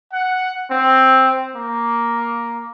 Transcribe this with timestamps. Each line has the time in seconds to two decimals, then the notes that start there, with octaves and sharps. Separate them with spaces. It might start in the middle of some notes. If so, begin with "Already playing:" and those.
0.13 F#5
0.71 C4
1.56 A#3